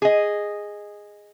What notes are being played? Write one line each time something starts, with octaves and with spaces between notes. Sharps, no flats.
G#4 D#5